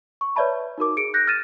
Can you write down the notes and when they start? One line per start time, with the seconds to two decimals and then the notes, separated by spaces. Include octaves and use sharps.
0.21 C#6
0.36 B4 C#5 D5 E5 A5 B5
0.78 D#4 F#4 A#4 D6
0.97 G#4 C#7 D7
1.14 F#6 G6 A#6
1.27 F6 A6 D#7 E7